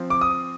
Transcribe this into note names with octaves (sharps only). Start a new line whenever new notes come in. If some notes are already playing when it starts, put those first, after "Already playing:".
Already playing: F3 C4
D6
D#6